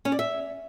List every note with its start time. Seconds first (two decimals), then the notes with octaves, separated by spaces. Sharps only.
0.05 C#4
0.12 D5
0.19 E5